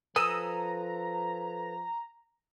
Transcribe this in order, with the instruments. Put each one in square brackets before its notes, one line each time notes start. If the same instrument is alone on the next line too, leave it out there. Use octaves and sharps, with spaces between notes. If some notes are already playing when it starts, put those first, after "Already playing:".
[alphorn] F3 [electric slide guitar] A4 B4 G#5 [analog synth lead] A#5 [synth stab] D#6 E6